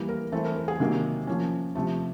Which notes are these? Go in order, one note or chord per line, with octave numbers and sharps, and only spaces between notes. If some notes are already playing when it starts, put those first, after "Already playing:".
Already playing: E3 G3 A#3
A#4
E3 A3 C4 A4
A#4
A#4
G#4
C3 D#3 F#3 A#3
F3 A#3 C#4
C3 F3 A3 A4